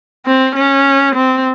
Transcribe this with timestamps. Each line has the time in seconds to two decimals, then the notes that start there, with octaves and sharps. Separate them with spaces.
0.26 C4
0.56 C#4
1.15 C4